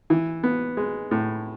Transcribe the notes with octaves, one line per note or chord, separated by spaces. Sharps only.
E3
B3
G#3
A2